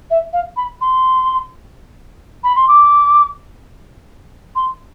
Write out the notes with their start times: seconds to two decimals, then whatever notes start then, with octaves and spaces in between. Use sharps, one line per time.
0.11 E5
0.33 F5
0.57 B5
0.81 C6
2.44 B5
2.56 C6
2.68 D6
4.56 C6